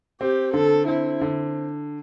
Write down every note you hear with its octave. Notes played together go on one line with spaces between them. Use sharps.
C4 G4
D3 A4
C4 E4
D3